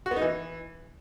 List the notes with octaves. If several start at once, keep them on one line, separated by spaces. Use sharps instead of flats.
F#4
B3
D#4
E3